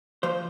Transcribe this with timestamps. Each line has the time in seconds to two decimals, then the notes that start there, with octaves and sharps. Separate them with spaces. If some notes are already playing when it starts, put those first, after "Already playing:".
0.23 F3 C5